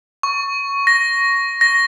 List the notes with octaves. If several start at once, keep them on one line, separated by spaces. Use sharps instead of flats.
C#6
A#6
A#6